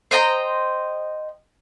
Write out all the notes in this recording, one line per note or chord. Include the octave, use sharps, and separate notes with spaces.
C5 D#5 G5 A#5